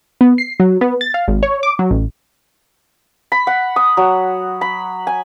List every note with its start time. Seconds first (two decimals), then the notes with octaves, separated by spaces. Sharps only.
0.21 B3
0.38 C7
0.60 F#3
0.81 B3
1.01 A6
1.14 F5
1.28 G#1
1.43 C#5
1.63 D6
1.79 F#3
1.91 A1
3.32 B5
3.47 F#5
3.76 D#6
3.97 F#3
4.61 B5
5.07 G#5